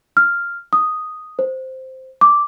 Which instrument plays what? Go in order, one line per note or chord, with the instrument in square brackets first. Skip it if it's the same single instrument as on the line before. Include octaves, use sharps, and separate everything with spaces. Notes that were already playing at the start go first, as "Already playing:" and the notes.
[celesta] F6
D#6
C5
D6